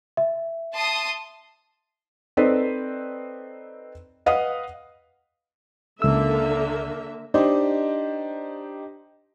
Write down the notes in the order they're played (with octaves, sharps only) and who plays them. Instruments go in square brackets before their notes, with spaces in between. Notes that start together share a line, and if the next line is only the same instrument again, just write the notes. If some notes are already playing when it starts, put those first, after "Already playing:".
[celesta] E5
[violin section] A5 C6 D#6
[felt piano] C4 D#4 A4 B4 C5 D5
B4 D#5 F5 F#5 D#6
[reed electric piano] C#2 E6 [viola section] D3 A#3 E5 [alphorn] A4
[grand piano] D4 D#4 G4 C5 D#5